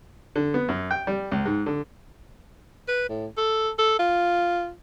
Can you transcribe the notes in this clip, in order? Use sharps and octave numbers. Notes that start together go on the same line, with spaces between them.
D3
B3
F#2
G5
G3
C#2
G#2
D3
B4
A2
A4
A4
F4